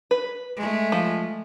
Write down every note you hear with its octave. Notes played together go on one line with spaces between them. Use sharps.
B4
G#3 A3
F3